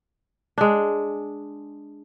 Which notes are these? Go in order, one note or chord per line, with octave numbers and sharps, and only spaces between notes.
G#3 D4